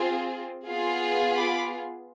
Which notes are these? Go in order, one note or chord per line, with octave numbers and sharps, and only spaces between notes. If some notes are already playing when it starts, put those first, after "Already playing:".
Already playing: C4 F4 G#4
B3 F4 G#4
B5 D6